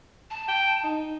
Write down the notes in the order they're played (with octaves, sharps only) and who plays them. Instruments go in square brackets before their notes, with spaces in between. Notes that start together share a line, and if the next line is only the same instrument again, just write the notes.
[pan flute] A5
[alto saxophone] G5
D#4